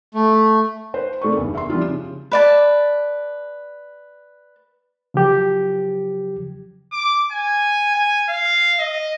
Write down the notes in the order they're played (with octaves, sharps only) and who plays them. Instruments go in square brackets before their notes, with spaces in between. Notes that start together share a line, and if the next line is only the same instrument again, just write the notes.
[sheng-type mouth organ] A3
[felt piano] B4 C5
C3 A3 A#4 D5 C#6
F#1 E2 G2
E5 C6
F3 G3 C4 D4 E4 F4
C#3
[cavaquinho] B4 D5 A5
[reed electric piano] C#3 F3 F#3 G4
[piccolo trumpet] D6
G#5
G#5
F5
D#5